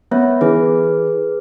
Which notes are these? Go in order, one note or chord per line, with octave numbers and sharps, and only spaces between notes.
B3 C#5 E5
E3 G#4 B4